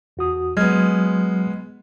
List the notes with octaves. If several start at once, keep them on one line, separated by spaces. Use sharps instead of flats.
E2 F#4 D#6
F#3 G#3 B3 F6 G#6